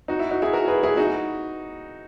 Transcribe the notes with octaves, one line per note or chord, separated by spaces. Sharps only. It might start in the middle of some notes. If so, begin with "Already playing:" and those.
D#4 F#4
E4
D#4 F#4
E4 G#4
F#4 A#4
G#4 B4
E4 G#4
D#4 F#4